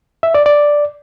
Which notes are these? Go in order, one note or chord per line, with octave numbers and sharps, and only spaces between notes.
E5
D5
D5